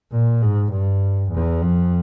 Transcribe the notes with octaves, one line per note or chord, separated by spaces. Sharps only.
A#2
G#2
G2
E2
F2